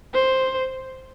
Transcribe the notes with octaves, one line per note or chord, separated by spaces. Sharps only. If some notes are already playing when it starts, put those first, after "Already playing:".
C5